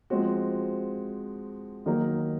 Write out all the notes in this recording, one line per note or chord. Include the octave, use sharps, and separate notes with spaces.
F3 G#3 C4 F#4
D#3 F#3 A#3 D#4 A#4